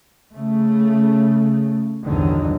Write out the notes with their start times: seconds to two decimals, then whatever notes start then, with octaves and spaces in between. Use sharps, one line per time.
0.34 C#3 A3
2.05 A#1 E2 G2 D3 D#3 F#3